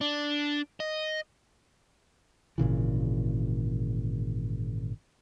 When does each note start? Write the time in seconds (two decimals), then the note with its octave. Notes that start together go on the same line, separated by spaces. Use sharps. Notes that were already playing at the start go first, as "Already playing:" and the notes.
0.01 D4
0.80 D#5
2.58 G#1 A#2 C#3 E3